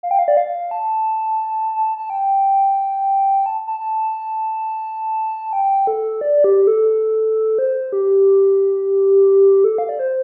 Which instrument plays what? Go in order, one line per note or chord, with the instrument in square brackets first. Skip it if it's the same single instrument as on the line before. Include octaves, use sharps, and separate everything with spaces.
[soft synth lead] F5
G5
F5
D5
F5
A5
A5
G5
A5
A5
A5
G5
A4
D5
G4
A4
C5
G4
A4
F5
D5
C5